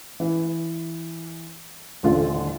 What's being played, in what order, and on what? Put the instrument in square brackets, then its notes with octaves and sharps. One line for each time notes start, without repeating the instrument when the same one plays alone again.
[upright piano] E3
D#1 A1 D3 F4